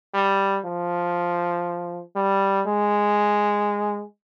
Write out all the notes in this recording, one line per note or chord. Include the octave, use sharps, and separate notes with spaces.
G3
F3
G3
G#3